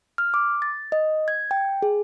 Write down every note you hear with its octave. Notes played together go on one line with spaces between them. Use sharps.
F6
D6
A6
D#5
G#6
G5
G#4